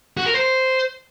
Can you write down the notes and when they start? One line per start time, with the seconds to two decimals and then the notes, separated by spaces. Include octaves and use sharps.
0.17 F#4
0.26 A#4
0.35 C5